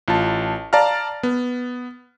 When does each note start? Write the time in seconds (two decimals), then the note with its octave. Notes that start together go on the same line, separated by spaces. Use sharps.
0.08 A1 F4 A5
0.73 D5 F5 A5 A#5 F6
1.23 B3